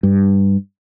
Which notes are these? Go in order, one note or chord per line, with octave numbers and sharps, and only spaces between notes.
G2